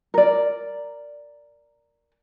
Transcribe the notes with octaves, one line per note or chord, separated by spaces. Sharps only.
A#4 D5